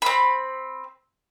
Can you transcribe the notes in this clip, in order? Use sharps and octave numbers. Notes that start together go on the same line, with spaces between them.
C4 B5